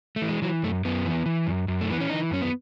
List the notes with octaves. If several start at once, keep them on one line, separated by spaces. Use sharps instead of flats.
A3
E3
G#3
E3 F#3
F#2 A3
F#2 B3
E3
E3
F#2
F#2
A3
E3 B3
C#4
E3 D#4
F#2 C#4
B3